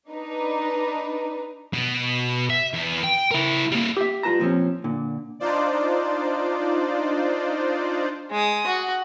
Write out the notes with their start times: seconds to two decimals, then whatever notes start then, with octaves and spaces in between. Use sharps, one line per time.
0.11 D4 D#4 B4
1.73 B2
2.50 E5
2.73 E2
3.04 G5
3.31 E4 A#4
3.72 G3 A#3
3.97 G4 E5
4.23 G3 F4 B4 A5 A#5
4.40 A#2 F3 C4 C#4
4.84 A#2 D3
5.40 D4 D#4 F4 C5 D5
8.31 G#3 D#6
8.67 F#4